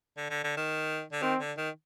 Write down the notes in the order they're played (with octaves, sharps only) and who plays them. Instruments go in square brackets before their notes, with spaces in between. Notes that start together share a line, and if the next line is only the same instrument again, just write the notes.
[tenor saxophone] D3
D3
D3
D#3
D3
[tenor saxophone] D#3 [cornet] C4
[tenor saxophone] D3
D#3